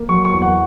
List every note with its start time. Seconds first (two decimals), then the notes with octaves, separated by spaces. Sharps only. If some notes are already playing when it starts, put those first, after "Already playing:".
Already playing: A#3
0.09 F#3 C#6
0.25 C#6
0.33 E2
0.42 F#5